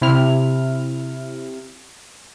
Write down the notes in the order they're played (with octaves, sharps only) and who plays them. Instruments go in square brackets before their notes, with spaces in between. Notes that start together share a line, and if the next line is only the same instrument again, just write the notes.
[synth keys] C3 E4 F6